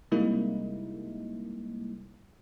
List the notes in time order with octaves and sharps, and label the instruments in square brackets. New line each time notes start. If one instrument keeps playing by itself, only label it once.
[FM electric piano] C3 G3 G#3 A#3 D#4 E4